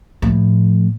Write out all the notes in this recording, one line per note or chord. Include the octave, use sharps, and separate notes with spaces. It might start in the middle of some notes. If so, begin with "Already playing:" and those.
A2 F3